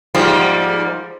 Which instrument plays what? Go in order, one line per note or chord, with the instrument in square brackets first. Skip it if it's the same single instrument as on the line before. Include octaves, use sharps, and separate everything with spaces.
[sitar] G#2 G3 A#3 [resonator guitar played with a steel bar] F3